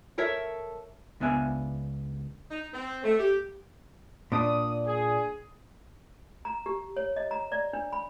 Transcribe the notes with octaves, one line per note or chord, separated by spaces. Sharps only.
A4 A#4 C#5 E5
C#2 B3 D4 E5 G#5
D#4
C4
A3
G4
A#2 D4 D#6
G#4
A#5
G4
C#5
D#5
A#5
D5
D4
B5